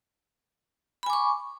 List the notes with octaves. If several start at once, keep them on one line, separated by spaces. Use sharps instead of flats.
G#5 B5 C#6 D6